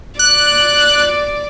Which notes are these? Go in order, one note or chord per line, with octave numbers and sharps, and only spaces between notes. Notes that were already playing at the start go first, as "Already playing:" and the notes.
D5 F#6